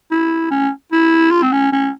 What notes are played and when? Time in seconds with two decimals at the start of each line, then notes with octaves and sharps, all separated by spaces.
0.11 E4
0.51 C#4
0.92 E4
1.31 F4
1.43 C4
1.52 C#4
1.72 C#4